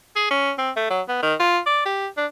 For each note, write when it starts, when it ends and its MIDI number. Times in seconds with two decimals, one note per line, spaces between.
0.16 0.28 68
0.30 0.52 61
0.58 0.71 60
0.76 0.87 57
0.90 1.01 54
1.09 1.21 59
1.22 1.34 51
1.40 1.59 65
1.66 1.82 74
1.85 2.07 67
2.17 2.26 62